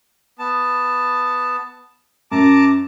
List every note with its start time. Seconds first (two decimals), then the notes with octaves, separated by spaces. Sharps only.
0.39 B3 A5
2.32 F#2 A5 A#5 D6